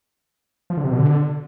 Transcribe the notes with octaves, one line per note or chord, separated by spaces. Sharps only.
F3
D3
C3
B2
D3